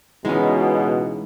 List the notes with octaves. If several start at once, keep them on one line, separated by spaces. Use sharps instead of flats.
C#2 B2 E3 G#3 C#4 D#4